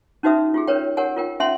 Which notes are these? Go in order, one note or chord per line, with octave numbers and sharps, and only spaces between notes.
C#4 D#4 F#4 B4 E5 D#6
F4 G4 G#4
C#4 A#4 B4 C#5 G5
G4 A#4 C#5 F#5 G#5
F4 A#4 G5
C#4 E5 F#5 G#5 C6